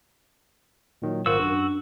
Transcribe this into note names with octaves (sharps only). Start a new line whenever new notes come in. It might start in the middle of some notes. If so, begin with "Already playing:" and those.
A#2 D#3 F#3
G#1 F4 F#4 A#4 C5 E6
F#2 D4